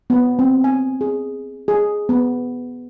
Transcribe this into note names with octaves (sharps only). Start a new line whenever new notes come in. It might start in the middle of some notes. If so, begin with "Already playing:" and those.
B3
C4
G#5
G#4
G#4
B3